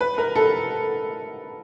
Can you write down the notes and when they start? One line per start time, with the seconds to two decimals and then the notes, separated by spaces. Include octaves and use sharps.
0.01 B4
0.18 A#4
0.36 A4